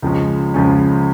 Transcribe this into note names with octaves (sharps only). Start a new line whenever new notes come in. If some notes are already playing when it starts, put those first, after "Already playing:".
C#2 C#3 F3 G#3 C#4
C#2 C#3 F3 G#3 C#4